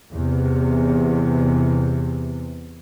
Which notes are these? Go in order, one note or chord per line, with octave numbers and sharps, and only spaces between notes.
E2 C3